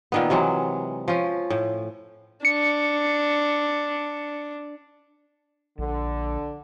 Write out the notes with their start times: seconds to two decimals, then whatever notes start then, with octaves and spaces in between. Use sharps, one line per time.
0.12 A#2 D#3 B3
0.30 C3 E3 F#3 G#3
1.08 F3 C#4
1.50 A2
2.45 D4 C#7
5.78 A#1 D3